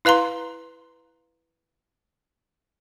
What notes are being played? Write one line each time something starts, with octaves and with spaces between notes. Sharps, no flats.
E4 B4 F5 A#5 C6